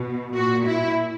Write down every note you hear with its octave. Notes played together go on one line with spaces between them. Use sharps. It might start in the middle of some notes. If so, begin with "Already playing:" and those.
Already playing: B2
A#2 F#4
E4